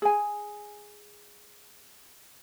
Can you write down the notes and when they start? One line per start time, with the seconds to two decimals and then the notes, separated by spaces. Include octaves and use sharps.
0.02 G#4 G#5